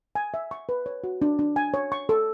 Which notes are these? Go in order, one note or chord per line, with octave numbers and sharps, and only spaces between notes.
G#5
E5
C#6
B4
C#5
F#4
D4
D4
G#5
C#5
C#6
A4